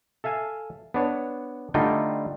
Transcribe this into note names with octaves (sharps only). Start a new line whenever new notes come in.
A4 E5 F5 G#5
B3 D4 C#5
D3 G3 A3 D#4 F4 G5